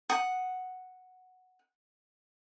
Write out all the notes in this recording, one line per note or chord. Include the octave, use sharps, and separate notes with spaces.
F#5 D#6